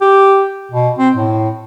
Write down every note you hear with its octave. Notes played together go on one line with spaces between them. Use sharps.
G4
B2
C4
A2